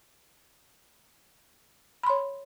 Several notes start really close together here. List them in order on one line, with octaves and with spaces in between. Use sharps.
B5 C6 C#5